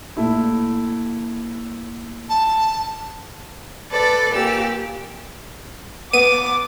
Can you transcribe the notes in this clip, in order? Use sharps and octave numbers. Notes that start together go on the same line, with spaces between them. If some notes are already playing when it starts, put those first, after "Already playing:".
A#2 A3 E4
A5
A4 B4 D5
A#2 G4 E6
B3 D6 D#7